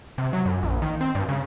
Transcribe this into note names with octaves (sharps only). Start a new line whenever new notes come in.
C3
F#3
F#2
A#1
D#3
C4
G2
C#3